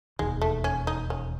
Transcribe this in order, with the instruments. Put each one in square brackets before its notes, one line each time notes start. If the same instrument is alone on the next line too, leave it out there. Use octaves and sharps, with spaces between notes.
[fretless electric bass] E1 D#2 D#3 [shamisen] G#3
[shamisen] A3
C#4
D#4
C#4